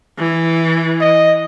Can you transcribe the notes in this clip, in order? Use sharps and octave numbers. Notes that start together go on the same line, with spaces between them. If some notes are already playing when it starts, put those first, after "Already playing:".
E3
D#5